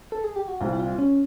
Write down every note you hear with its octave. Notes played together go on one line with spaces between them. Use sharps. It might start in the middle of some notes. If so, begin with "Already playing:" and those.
A4
G#4
G4
F#4
C2 A#2 G3 C4 F4
E4
F4
C#4